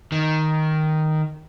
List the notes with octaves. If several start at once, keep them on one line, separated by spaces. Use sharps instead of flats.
D#3